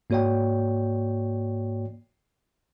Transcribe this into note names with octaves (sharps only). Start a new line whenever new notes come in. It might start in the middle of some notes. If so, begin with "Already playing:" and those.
G#2 A#3 F#4 C#5 D5 G5